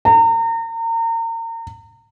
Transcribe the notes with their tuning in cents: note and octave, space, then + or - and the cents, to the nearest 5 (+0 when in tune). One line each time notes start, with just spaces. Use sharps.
A#5 -35